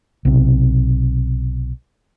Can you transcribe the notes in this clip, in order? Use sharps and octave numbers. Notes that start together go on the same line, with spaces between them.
B1 C3